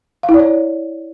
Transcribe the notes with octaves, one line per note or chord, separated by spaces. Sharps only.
F5
E4
D5
C#5